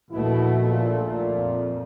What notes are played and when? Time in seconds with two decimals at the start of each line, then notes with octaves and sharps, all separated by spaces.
0.11 A#1 D#2 B2 A3 E4
0.69 A#2 F4
1.31 F2